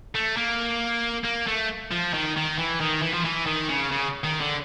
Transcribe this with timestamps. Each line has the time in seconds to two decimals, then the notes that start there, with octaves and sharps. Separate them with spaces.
0.15 A3
0.37 A#3
1.25 A#3
1.48 A3
1.92 F3
2.14 D#3
2.37 D#3
2.59 E3
2.80 D#3
3.02 E3
3.14 F3
3.24 E3
3.46 D#3
3.70 C#3
3.92 C#3
4.24 D#3
4.41 D3